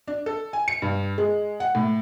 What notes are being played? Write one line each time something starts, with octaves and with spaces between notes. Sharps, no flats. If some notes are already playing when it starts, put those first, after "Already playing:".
D4
A4
G#5
C#7
G2
G#3
F#5
A2